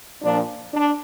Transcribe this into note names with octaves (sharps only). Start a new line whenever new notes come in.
A#2 F3 D4
D4